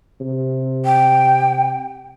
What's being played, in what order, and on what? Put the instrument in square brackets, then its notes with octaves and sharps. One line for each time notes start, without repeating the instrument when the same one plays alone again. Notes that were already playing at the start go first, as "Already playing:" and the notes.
[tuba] C3
[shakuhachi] G5